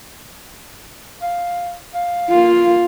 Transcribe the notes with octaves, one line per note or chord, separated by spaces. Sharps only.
F5
F5
A#3 F4